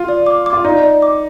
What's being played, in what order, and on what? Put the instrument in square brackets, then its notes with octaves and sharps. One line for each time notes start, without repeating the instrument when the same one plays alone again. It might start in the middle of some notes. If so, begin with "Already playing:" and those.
Already playing: [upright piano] F4
[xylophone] D5
D6
D6
[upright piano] F4
[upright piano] D#4 [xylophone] D5
[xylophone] D5
D6